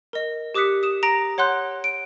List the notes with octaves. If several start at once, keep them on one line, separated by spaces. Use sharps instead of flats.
A#4 D#5
G4 D6 D#6 F#6 B6 C#7
D#6 E7
A#5 A#6 D7
C#5 F#5 C6 F#6 G6
D7